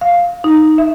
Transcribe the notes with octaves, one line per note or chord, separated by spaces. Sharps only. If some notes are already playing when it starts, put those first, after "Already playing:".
F5
D#4
E5